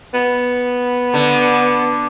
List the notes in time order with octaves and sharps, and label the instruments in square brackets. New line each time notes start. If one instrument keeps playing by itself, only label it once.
[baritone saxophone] B3
[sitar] D3